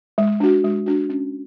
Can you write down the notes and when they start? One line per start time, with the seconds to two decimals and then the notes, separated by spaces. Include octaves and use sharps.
0.18 G#3
0.40 D4 F#4
0.64 G#3
0.86 D4 F#4
1.10 C#4